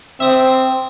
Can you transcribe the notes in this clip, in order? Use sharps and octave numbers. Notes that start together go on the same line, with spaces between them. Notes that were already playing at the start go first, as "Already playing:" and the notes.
C4 E5 D#6